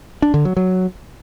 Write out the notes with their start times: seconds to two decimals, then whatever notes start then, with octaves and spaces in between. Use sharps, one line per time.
0.22 D4
0.34 D3
0.45 F#3
0.57 F#3